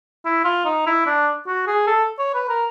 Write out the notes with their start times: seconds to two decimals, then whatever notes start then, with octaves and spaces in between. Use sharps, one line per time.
0.25 E4
0.44 F4
0.65 D#4
0.86 E4
1.06 D4
1.47 F#4
1.67 G#4
1.87 A4
2.19 C#5
2.34 B4
2.49 A#4